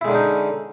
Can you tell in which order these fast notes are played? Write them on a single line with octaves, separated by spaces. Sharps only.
E4 G#3 D3 C#4 D#4